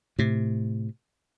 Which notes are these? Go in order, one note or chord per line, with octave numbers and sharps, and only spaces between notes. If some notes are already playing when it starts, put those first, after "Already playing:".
A2 C3